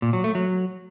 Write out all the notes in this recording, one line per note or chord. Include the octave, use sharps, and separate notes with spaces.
A#2
F#3
A3
F#3